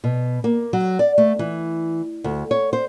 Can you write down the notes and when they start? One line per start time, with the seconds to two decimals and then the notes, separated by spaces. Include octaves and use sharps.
0.04 B2
0.44 A#3
0.73 F#3
0.99 D5
1.18 A3
1.39 E3
2.24 D2
2.51 C#5
2.73 C5